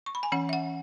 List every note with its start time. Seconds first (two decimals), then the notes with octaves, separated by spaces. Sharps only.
0.06 C#6
0.15 B5
0.23 G#5
0.32 E3 C#4 F#5
0.49 E5
0.53 F#5